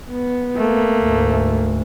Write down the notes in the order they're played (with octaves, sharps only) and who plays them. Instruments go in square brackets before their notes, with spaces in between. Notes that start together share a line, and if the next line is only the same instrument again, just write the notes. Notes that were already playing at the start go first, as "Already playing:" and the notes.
[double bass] B3
[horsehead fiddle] A3 A#3
[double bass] D2 G#2